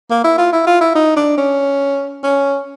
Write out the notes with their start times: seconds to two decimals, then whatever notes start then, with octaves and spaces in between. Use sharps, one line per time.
0.10 A#3
0.24 E4
0.38 F4
0.53 E4
0.67 F4
0.81 E4
0.95 D#4
1.16 D4
1.37 C#4
2.23 C#4